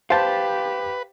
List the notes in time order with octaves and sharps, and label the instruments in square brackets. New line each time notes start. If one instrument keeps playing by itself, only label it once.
[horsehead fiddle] G4 [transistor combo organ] B4 [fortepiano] C5 A5 [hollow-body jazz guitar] F5